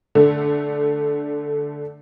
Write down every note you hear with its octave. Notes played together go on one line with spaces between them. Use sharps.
D3 A3